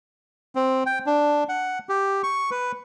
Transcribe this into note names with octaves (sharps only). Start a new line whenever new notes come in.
C4
G5
D4
F#5
G4
C#6
B4